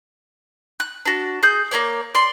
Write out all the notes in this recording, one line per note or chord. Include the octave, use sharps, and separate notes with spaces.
F#6
D4 F#4
G#4 G6
A#3 E4 C#5 D5
D5 C6